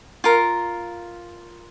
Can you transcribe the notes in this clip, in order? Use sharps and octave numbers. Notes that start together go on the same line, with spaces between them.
F4 A#4